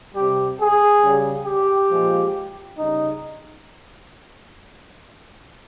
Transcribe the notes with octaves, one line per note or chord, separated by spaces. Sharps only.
C3 G3 G4
G#4
C#3 G3
G4
A#2 F3 G#3
C#3 G3 D#4